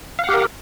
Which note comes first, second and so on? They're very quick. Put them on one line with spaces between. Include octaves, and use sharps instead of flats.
F5 F#5 G4 A#4